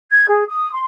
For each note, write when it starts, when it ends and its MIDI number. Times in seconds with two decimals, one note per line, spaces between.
0.10 0.25 92
0.27 0.43 68
0.47 0.71 87
0.72 0.85 84